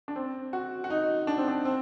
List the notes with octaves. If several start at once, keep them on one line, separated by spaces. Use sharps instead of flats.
D4
C4
F#4
F#4
D#4
D4
C4
D4
C4